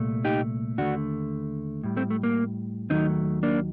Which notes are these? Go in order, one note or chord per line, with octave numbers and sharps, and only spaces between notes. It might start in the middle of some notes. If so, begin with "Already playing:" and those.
Already playing: C2 A#2 A3
D#4 G4
D#2 D3 A3 D4 F#4
A2 G3
A3 C4
A3
A#3
D#2 D#3 F#3 A3 C4 D#4
A#3 D4